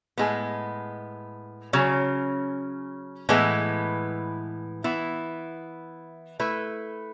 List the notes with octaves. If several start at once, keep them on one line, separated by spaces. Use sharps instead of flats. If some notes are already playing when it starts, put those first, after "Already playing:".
A2 G#3 B3
C#3 F#3 C#4
A2 E3 G#3 B3 E4
E3 B3 E4
A3 E4 B4